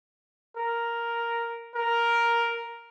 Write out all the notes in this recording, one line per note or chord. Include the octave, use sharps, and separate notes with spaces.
A#4
A#4